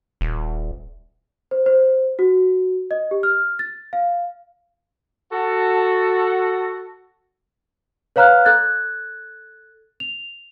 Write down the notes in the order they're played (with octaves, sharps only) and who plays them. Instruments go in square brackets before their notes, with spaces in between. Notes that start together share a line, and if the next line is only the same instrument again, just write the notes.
[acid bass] D#1
[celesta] C5
C5
F#4
D#5
G4
F6
A6
F5
[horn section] F#4 A4
[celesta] B4 C#5 F5 A#5 F6 F#6
A4 F#6 G#6 A6
F7